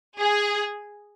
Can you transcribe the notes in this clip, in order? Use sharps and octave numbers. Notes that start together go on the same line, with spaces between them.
G#4